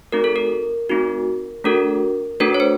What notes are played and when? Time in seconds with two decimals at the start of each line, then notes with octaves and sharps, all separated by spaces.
0.12 A3 C4 D#4 F#4 A#4
0.24 A4
0.36 A#4
0.89 A3 C4 D#4 F#4
1.64 A3 D4 F#4 A4 A#4
2.40 A3 D4 F#4 A4 B4
2.54 C#5
2.60 C5